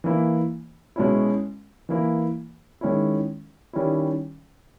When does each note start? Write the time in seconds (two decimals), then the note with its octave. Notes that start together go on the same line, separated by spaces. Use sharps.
0.04 E3 A#3 E4
0.96 B2 G#3 C#4 E4
1.89 E3 A#3 E4
2.81 D#3 G#3 C#4 E4
3.73 D#3 G3 C#4 E4